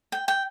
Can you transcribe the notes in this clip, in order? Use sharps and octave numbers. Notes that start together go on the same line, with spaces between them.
G5
G5